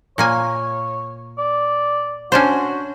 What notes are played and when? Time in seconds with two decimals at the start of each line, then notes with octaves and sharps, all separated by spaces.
0.18 A#2 A#3 C#5 G#5
1.38 D5
2.32 C#4 D4 F#4 C5